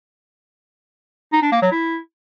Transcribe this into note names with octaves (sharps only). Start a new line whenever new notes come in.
D#4
D4
A#3
F#3
E4